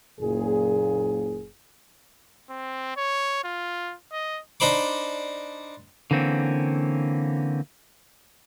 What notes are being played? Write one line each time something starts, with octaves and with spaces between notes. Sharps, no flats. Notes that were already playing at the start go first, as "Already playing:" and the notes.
F#1 A#2 G#4
C4
C#5
F4
D#5
D4 D#4 C5 B5 D6
D3 E3 A#3 C4 C#4